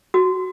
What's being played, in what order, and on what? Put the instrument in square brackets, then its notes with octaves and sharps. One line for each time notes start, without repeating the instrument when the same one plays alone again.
[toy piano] F#4